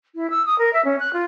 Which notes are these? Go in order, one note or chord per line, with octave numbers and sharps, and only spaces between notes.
E4
E6
D#6
A#4
E5
C#4
F#6
F4